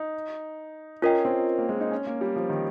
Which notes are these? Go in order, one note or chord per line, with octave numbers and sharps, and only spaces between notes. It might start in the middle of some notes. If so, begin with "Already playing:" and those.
Already playing: D#4
C#4 F4 A#4 D#5 G5
C4
A#3
G#3
D#4
C#4
A#3
G3
F3
D#3